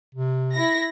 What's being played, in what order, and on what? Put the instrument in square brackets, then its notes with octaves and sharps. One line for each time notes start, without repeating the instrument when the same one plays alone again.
[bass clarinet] C3
[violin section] E4 A#6